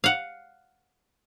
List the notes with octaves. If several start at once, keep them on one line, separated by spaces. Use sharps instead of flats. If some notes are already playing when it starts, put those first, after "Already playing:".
F5 F#5